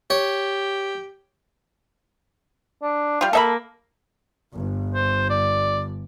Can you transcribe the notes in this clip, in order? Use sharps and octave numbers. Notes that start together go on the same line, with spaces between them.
G4 C#5
D4
G3 F4 F5
A#3 A4 E5 B5
G1
C5
D5